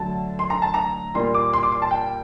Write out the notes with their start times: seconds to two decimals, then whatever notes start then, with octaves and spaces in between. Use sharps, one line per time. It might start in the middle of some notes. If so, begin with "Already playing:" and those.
Already playing: D3 F#3 A3 A5
0.39 C6
0.50 A#5
0.62 A5
0.74 A#5
1.14 A#2 G3 A#3 C6
1.34 D6
1.53 C6
1.63 D6
1.72 C6
1.82 A5
1.91 G5